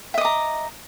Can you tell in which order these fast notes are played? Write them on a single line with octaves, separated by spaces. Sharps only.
E5 D#5 D6 A#5